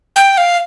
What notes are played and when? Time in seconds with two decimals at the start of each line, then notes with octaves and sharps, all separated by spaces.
0.16 G5
0.38 F5